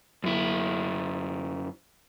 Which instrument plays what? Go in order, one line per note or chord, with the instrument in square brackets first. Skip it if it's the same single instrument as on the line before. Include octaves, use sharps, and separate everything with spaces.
[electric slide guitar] F#2 E4